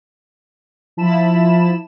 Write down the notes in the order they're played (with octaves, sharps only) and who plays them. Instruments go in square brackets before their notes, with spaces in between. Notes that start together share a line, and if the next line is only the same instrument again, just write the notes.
[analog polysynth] F3 E4 A5 B5 E7